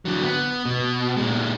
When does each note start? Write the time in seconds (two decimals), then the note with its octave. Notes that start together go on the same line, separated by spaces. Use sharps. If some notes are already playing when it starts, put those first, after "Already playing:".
0.05 D3 F#3
0.23 B3
0.65 B2
1.16 A#2 G#3